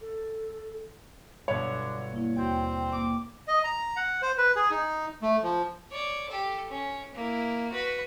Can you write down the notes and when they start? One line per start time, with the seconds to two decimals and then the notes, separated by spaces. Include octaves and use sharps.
0.01 A4
1.48 G1 B2 D3 B3 C#5
2.12 A#3 E4
2.36 D#2 C4 F#4 G5 G6
2.92 A#3 D6
3.48 D#5
3.64 A#5
3.96 F#5
4.22 C5
4.38 B4
4.56 G#4
4.71 D#4
5.22 A3
5.43 F3
5.91 C#5 D5
6.29 G4 A4
6.69 C#4
7.15 A#3 E4
7.71 F#4 B4